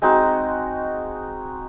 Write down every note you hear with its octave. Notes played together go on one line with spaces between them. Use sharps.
G#3 C4 D#4 F#4